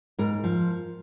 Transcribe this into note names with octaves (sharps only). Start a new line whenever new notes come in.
G#2 A#4
F3